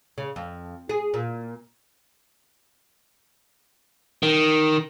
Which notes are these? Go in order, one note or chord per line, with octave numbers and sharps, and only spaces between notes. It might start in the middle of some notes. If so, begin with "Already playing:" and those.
C#3
F2
G#4
A#2
D#3